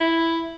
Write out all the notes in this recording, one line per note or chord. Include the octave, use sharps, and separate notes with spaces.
E4